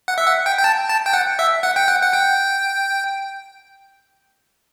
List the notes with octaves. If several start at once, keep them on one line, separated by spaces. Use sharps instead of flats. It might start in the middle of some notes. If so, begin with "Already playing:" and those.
F#5
E5
F#5
G5
G5
A5
A5
G5
F#5
E5
F#5
G5
F#5
F#5
G5